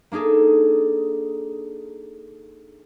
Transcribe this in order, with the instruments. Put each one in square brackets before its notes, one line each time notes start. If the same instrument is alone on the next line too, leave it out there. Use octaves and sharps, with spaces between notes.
[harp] A#3 D4 D#4 G#4 A4